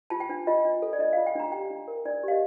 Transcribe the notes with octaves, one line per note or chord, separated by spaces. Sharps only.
F4 A5
G5
D4
F4 D#5
D4
A4
D5
D4 D#5
F4 F5
G5
D4 A#5
G4 G5
D4
A#4
D4 D5
G4 F5
D#5